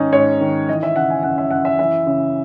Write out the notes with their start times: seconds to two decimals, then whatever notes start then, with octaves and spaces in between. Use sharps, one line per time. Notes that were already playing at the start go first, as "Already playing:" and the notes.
Already playing: G#2 D#3 C#4 D#4
0.13 G#2 C#5
0.40 D#3
0.69 E3 D#5
0.83 E5
0.96 C#3 F#5
1.10 G#5
1.23 F#2 F#5
1.38 E5
1.51 F#2 F#5
1.65 E5
1.79 E3 E5
2.07 C#3